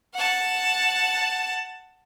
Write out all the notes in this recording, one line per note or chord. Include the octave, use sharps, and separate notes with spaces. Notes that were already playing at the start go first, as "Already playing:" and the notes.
F#5 A5